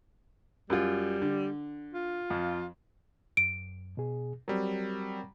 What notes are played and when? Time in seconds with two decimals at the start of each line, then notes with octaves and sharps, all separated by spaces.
0.70 F#2 G3 F4
1.22 D3
1.93 F4
2.30 F2
3.37 F#2 D7
3.97 B2 G#4
4.48 F#3 G3 C4 A#4